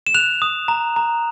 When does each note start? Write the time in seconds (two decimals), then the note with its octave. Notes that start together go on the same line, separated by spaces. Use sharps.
0.07 E7
0.15 F#6 F7
0.42 D#6
0.68 A#5
0.96 A#5